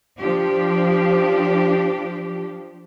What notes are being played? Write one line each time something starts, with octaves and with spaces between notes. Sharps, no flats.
F3 D4 G4